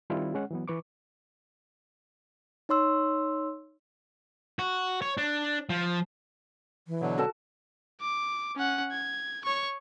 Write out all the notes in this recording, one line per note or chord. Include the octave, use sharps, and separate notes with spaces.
D#3 G3 C4 E4 F4
G#3 C#4 F#5
E3 F#3 B3
E3 B4 C#6 D6
D#4 C#5 C6 E6
F#4
C#5
D4
F3
E3
B2 D3 F#3
F#4 A4 A5
D6
C#4 F#5
G#6
C#5 C#6